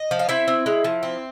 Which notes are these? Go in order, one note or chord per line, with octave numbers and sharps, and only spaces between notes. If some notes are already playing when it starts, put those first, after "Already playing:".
Already playing: D#5
F3
F5
C4 E4 E5
C4
G#3
F3
C4